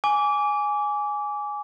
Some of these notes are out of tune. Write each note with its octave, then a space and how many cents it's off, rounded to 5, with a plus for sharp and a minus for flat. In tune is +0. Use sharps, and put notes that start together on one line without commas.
G#5 +0 D6 -25